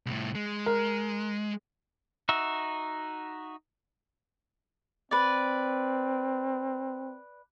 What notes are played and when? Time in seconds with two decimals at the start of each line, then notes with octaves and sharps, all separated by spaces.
0.06 C2 A2
0.35 G#3
0.66 A#4
2.29 D#4 F#4 E5
5.11 C4 B4 D5